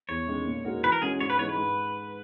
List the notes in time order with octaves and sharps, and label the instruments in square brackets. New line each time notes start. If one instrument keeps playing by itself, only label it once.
[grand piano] E2 [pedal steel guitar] C#5
[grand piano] D#3 G#3 C#4
A#2
G#3 D#4 F#4 A#4
[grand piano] E3 [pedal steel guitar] B4
[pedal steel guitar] A#4
[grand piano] G#3 C#4 F#4 [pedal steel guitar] G#4
[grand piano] G#2 [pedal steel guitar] C#5
[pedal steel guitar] B4
[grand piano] E3 G#3 D#4 [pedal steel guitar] C#5
[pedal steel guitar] B4
[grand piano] G#2